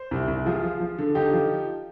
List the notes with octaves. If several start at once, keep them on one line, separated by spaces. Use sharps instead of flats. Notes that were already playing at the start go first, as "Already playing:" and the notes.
Already playing: C5
C2
C2
F3 F4 G#4
F3
F3
D3
D3 D#4 G4
F3